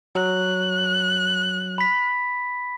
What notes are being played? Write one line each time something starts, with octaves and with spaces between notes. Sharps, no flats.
F#3 F#6
B5 B6